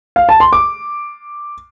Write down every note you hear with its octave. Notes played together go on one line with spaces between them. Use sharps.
F5
A5
C6
D6